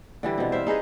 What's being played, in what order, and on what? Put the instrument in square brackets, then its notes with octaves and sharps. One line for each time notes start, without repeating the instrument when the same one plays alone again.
[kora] D3 E3 G3
B2 C4
C5 E5 F5
D#4 G#4 B4 D#5